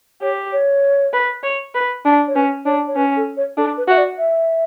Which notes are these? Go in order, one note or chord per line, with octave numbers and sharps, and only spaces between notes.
G4 C#5
C#5
B4
C#5
B4
D4
C#5
C#4 B4
D4 C#5
C#5
C#4 B4
A4
C#5
D4 A4
B4
F#4 E5
D5
E5